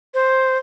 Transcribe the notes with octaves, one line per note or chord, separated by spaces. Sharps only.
C5